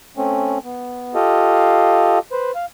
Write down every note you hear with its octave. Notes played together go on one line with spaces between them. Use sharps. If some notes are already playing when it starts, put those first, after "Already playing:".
A3 C4 C#4
B3
F4 G4 A4 D#5 F5
B4 C5
F5